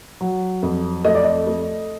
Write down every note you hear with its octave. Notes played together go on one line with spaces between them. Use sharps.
F#3
F2
A3 D#5
D5
D#5
A3